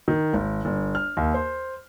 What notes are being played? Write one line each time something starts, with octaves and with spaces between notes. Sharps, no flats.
D#3
G#1
G1
F6
D#2
C5